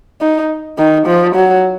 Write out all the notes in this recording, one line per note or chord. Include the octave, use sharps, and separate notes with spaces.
D#4
D#3
F3
F#3